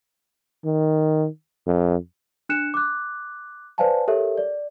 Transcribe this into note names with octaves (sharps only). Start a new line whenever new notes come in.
D#3
F2
D4 F#6 C#7 E7
D6 F#6
B4 C5 D5 F5 G#5 A5
G4 A4 A#4 C#5 E5
D5